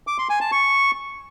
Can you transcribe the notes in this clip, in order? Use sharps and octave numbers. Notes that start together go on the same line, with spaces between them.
D6
C6
G#5
A5
C#6